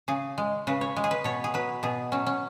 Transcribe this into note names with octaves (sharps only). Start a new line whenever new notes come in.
C#3 G#4
G#3
C#3 B4
C#5
G#3
G#4
B4
B2 C#5
G#4
F#3 B4
B2 G#4
F#3 C#4
C#4